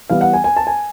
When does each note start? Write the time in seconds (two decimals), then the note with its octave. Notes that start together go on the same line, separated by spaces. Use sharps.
0.10 E3 G3 B3 F5
0.21 F#5
0.33 G#5
0.44 G#5
0.57 A5
0.67 G#5